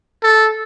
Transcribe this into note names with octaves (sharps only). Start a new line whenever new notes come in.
A4